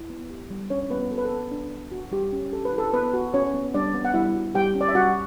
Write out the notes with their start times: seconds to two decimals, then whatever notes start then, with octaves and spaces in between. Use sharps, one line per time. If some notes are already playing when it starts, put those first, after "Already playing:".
Already playing: E4
0.10 B3
0.30 G4
0.50 G3
0.70 C#4 D4 C#5
0.90 G3 B3 B4
1.11 F#4 A4
1.18 B4
1.25 A4
1.31 B3
1.51 D4
1.71 B3
1.92 F#4
2.11 G3 G4
2.33 C#4
2.52 G4 A4
2.65 B4
2.73 E4
2.78 A4
2.93 B3 B4
3.13 F#4
3.33 C#4 F#4 C#5
3.54 B3
3.74 G3 D4 D5
3.94 B3
4.05 F#5
4.14 G3 E4 E5
4.34 F#4
4.55 G3 G4 G5
4.75 C#4
4.81 D5
4.89 E5
4.95 G3 F#4 F#5